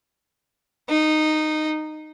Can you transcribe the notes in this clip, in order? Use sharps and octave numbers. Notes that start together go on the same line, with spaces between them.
D#4